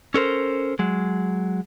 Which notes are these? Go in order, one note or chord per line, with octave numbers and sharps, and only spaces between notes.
C#4 A4 A#4 C5
F#3 G#3